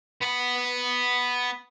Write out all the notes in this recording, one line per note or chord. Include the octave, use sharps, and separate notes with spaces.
B3 B5